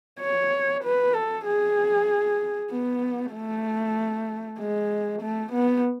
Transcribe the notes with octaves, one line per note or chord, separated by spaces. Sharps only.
C#5
B4
A4
G#4
B3
A3
G#3
A3
B3